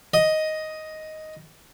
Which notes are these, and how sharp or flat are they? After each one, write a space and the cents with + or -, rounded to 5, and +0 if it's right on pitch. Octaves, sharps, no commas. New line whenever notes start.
D#5 +5